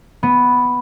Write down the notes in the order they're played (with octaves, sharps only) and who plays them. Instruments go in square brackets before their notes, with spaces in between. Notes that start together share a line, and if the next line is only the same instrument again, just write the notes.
[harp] B3